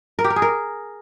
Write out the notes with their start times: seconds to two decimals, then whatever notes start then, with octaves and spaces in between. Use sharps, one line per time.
0.19 A#4
0.24 G4
0.30 A#4
0.36 G#4
0.42 A#4